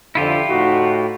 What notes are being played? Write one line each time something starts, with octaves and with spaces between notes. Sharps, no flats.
F2 D3 E4 F4 G4
A2 D#4 F#4